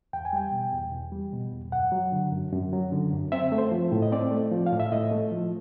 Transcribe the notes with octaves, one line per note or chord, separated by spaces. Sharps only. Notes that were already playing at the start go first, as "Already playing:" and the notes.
E2 G5
G#5
G3 G5
B2
E2
E2
G3
B2
E2
F#2 F#5
F#3
D3
F#2
F#2
F#3
D3
F#2
C4 E5
A3
C5
F3
A2
D#5
C4 D5
A3
F3
F5
A2
E5
A2 D#5
A3
F3